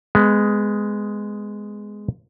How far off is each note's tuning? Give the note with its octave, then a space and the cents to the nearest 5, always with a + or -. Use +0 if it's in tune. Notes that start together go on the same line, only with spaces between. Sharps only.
G#3 +0 B3 +20